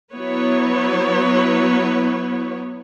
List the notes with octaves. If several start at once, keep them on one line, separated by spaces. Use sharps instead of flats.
F#3 B3 E4 B4 C#5